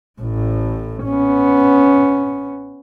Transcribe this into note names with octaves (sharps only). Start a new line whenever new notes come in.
A1 A2
B3 C#4